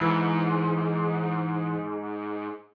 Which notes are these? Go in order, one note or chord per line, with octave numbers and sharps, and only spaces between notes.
G#2 E3